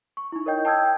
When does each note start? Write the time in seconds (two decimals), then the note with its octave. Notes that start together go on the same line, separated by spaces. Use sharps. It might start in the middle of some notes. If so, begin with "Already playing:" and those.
0.17 C#6
0.32 D#4 E4
0.46 A#4 C#5 D#5 G5 G6
0.65 G5 A5 D#6 E6 G6 G#6